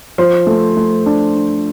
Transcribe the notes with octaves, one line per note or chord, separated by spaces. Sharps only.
F3 C5
A3
A3
D4
D4